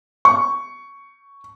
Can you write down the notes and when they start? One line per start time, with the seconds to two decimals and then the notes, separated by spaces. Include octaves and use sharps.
0.25 C#6